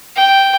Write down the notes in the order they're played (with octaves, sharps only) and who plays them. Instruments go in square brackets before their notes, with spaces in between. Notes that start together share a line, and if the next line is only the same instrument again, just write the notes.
[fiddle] G5